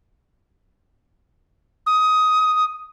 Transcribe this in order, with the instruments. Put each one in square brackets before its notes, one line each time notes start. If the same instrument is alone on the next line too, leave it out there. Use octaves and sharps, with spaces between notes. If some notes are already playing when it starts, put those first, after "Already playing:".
[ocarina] D#6